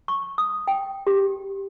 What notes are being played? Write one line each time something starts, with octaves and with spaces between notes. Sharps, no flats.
C#6
D#6
G5
G4